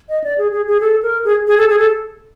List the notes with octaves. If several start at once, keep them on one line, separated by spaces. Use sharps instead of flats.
D#5
D5
G#4
G#4
G#4
A4
A#4
G#4
G#4
A4
G#4
A4